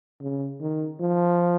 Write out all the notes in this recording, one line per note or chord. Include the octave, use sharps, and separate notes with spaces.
C#3
D#3
F3